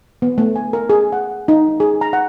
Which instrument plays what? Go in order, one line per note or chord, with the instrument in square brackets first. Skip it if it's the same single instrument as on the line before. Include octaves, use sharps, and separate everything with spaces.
[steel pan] B3
A3
G#5
A#4
G#4
F#5
D#4
G#4
A#5
F#5